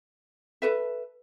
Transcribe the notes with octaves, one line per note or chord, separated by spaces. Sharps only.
A4 B4 E5